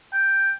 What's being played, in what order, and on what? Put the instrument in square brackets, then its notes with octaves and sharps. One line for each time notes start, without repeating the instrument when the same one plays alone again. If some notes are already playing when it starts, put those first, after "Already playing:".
[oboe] G5